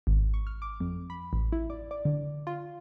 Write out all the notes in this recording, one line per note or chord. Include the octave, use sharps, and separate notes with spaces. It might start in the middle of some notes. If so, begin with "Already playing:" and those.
G#1
C#6
F6
D6
F2
B5
A1
E4
D5
D5
D3
F4